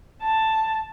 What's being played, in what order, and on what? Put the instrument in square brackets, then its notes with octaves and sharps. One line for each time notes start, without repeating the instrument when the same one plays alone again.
[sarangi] A5